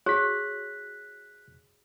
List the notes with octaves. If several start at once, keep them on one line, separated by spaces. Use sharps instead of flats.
F#4 G#4 C#5 F#6 B6